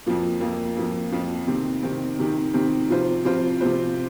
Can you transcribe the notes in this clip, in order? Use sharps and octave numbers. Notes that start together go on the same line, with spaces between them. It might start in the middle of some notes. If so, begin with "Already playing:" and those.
F2 F3 A#3
F2 F3 A#3
F2 F3 A#3
F2 F3 A#3
C3 D#3 C4
C3 D#3 C4
C3 D#3 C4
C3 D#3 C4
C3 F3 C4 F4 C5
C3 F3 C4 F4 C5
C3 F3 C4 F4 C5